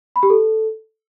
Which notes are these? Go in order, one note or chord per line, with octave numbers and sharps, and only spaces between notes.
B5
G4
A4